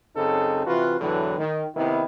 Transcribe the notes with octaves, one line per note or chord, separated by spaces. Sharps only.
F#2 C#3 C4 D#4 A4
C3 E3 F4 F#4 B4
E2 A2 D3 E3 F#3
D#3
C3 D#3 B3 E4